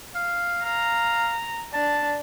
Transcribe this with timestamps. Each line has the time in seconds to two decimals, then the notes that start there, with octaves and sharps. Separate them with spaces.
0.15 F5
0.65 F5 A#5
1.74 D4 A5